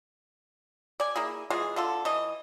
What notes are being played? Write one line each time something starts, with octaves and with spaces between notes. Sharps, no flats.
D5 G#5
A#3 E4 G#4
E3 G#3 F4 G#4
D3 F4 A4
E3 D#5